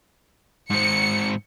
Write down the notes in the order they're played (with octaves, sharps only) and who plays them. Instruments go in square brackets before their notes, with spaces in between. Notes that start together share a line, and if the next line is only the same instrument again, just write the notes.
[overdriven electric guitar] G#2 C4 [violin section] C#7